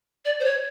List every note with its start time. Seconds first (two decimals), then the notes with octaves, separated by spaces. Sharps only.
0.24 D5
0.39 C5
0.44 C#5